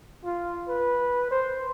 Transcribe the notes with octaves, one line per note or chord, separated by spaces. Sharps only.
F4
B4
C5